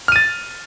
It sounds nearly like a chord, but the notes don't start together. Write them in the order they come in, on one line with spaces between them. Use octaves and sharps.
F6 D#7 A6